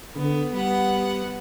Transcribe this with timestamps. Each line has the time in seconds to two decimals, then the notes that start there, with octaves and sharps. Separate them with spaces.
0.16 D3 B3
0.53 G3 B3 F#5